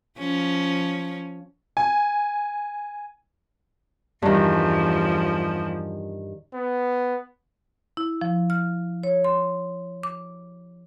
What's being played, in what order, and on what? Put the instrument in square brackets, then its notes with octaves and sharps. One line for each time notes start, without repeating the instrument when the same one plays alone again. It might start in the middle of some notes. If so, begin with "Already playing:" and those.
[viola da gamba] F3 C#4
[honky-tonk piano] G#5
[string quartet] E2 F3 [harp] G2 D#3
[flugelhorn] B3
[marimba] E4
F3
F6
C#5
C6
D6